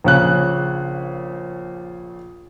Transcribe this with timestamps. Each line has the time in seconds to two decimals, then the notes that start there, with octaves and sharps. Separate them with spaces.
0.04 A#1 C#3 F#6